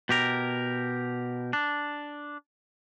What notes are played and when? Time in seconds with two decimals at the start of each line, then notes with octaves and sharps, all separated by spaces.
0.09 B2 G4 A#4
1.53 D4